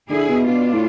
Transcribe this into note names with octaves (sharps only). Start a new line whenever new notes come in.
D3 E4 G#4
B2
B2 D4 F4
A2